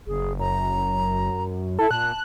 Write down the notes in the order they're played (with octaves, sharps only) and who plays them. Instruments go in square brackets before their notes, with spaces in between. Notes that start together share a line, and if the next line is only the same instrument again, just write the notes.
[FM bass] F#1 [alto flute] G#4
[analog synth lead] F#2 [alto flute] A#5
[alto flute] E4 [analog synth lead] A4
[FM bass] A#2 [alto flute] A5 [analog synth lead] F#6